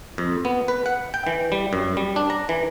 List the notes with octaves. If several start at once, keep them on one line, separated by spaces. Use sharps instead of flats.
F2
B3
B4
F#5
G5
E3
G3
F#2
G3
D4
A#5
E3